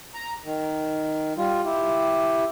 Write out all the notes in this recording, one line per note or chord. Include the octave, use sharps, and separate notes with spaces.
A#5
D#3
G3 F4
E4 G4